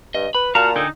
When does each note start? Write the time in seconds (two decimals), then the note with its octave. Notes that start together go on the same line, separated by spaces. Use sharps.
0.15 G2 D#5
0.35 B4 B5
0.55 A#2 F#4 F5 A5 A#5
0.76 D3 D#4 A4 G5 G#5